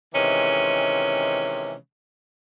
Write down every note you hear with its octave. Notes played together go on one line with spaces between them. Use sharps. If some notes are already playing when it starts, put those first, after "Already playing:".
C3 D#3 E3 G#3 C#4